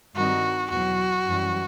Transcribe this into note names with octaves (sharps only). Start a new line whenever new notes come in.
G2 D#3 G3 C4 D#4 F#4
E2 B2 F#3 F#4
F#2 E3 G3